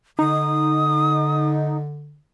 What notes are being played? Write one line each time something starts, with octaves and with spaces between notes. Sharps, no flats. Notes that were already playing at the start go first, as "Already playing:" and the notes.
D3 D#4 D#6